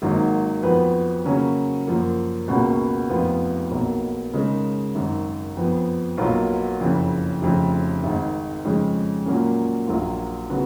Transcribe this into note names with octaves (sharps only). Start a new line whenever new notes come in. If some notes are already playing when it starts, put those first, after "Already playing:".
G#1 G#2 D#3 F#3 A#3
F2 F3 B3 F#4 B4
C#3 F#3 A#3 C#4
F#2 F3 A#3
C#2 B2 A#3 C#4 F#4
F1 F2 F3 B3 F4
B1 B2 A#3
C#3 G#3 D#4 A#4
G#1 F#2 D#3
F2 F3 B3
B1 B2 F#3 A#3 F4
F#1 F2 C#3
F1 F2 C#3
G#1 G#2 D#3
F2 C#3 G#3 C#4
A#2 F#3 A#3 C#4
A#1 A#2 F#3 A#3 F4
C#3 F#3 B3 F#4